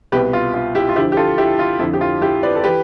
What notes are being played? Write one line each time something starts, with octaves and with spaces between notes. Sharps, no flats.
C2 B2 G4 B4
F4
F4
E4 G4
F4
D2 D3 F3 E4 G4
G4
F4 A4
E4 G4
F4
F2 D3 F3 E4
G4
F4
E4 G4
B4 D5
A4
E3 G4 B4